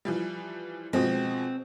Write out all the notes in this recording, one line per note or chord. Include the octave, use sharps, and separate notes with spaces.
E3 F3 G3
B2 F3 G#3 C4